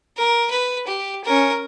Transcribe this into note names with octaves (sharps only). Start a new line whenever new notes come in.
A#4
B4
G4
C#4 A#4